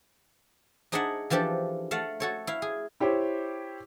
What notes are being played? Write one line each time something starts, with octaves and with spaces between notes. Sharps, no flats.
D4 D#4 G#4 D5 E5 F#5
E3 F3 D4 G4 A4
A3 F5 F#5 A5
F#4 A4 C#5
E4 F5
G#4
E4 G4 C5 C#5